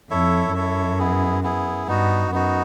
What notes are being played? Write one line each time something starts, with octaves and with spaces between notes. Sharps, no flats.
F2 E4 A4 C#5 E5
F#2 E4 A4 C#5 E5
B3 E4 G#4
B3 E4 G#4
G2 B3 D#4 F#4
F#2 B3 D#4 F#4